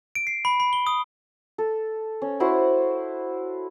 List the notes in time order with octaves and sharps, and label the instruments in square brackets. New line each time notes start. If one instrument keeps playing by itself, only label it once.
[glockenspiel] D7
C7
B5
B5
G7
D#6
[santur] A4
C#4
E4 F#4 C5 F#5